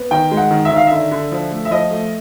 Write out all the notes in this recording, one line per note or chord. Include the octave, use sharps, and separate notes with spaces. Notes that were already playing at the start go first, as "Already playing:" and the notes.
Already playing: B3
D#3 G5
G#3
F#5
D#3
E5
D#3 F5
D3 E5
D3
F3
A3
E5
F3 D#5
A3